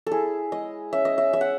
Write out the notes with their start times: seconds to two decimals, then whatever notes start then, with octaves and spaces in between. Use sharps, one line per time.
0.07 E4 G#4 A4
0.52 G#3 D#5
0.93 C#4 E5
1.05 D#5
1.18 E5
1.33 G#3 E5
1.41 F#5